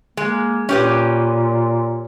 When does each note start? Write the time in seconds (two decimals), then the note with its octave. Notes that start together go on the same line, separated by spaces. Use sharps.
0.17 G#3 A#3
0.69 A#2 C#4 G4 B4